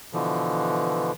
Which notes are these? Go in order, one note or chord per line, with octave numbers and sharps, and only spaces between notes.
B2 D3 E3 F3